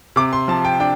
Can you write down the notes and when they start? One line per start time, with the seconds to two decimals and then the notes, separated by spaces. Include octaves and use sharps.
0.16 C3 D6
0.33 C6
0.48 F3 A5
0.65 G5
0.80 D4 G5